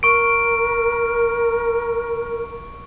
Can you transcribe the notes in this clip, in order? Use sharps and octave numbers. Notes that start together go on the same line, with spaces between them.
A#4 C#6 D7